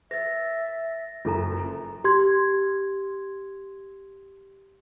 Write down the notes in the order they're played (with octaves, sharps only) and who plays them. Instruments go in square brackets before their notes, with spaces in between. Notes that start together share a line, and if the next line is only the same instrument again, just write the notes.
[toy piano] B4 [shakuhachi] E5 [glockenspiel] A6 A#6
[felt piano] F#1 F#2 [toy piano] F4 A4 A#5
[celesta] G4 C6 G#6